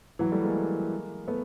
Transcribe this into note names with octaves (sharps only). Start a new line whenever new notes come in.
E3 F#3
G3 A3
G#3 A#3
A3 B3